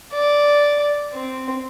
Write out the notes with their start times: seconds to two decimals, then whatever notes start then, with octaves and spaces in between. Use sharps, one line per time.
0.13 D5
1.13 C4